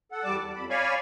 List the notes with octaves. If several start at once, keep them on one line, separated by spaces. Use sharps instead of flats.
A4 F#5
E2 G3 D5 A5 D6
G3
F2 B5
C#5 D5 F5 G#5 B5 C#6